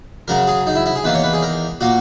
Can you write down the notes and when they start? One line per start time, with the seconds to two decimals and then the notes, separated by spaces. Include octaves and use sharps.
0.28 F#2 C#3 F#3 A#4
0.48 G#4
0.67 D#4
0.76 E4
0.86 E4
0.95 G#4
1.04 E2 D#3 A#3 B4
1.14 C#5
1.24 B4
1.33 G#4
1.42 A#4
1.81 A#2 A#3 F#4